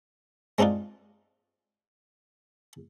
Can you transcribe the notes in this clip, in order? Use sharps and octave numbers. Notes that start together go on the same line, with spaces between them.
G#3 C4 D4 D#4 F4